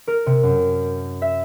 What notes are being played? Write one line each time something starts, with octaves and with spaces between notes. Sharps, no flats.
A#4
C3
F#2
E5